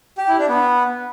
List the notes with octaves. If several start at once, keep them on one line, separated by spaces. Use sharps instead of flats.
G4
E4
D4
B3